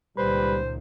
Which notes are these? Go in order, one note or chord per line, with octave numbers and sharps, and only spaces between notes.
C#2 A#2 D#3 G3 B4 C5